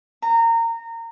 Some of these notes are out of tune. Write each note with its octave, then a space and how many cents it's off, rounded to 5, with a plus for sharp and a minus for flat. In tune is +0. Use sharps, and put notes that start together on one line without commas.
A#5 -25